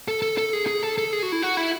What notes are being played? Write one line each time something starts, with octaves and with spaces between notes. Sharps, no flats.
A4
A4
A4
G#4
G#4
A4
A4
G#4
F#4
E4
F#4
E4